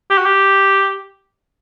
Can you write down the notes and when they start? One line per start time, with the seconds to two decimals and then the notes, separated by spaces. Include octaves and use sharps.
0.10 G4
0.18 F#4
0.26 G4